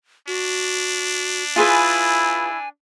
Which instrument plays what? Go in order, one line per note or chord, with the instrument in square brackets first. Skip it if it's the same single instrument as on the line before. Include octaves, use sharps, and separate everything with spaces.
[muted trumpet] D4 [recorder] F#4
[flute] E4 [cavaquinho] F4 G#4 B4 [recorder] G#5